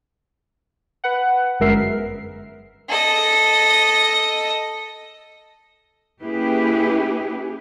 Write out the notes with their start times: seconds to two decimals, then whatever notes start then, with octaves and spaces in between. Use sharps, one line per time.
1.04 B4 F#5
1.60 G1 F#2 G#3 A#4 E5 C7
2.89 A4 D#5
6.22 A#3 C#4 E4 G4 G#4 B4